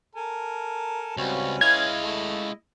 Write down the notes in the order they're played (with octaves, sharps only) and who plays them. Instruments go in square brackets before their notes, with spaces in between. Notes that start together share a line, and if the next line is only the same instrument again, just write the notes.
[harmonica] A4 A#4 A5 [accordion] G#5
[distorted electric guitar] C#2 [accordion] G3 C4 F#4 [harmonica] C#4 B4
[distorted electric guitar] G#3 F5 [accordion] E4 D#5 [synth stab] G#6
[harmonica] A3